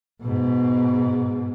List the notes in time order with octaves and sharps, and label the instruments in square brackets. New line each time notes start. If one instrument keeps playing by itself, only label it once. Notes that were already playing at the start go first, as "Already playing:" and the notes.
[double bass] G#2 B2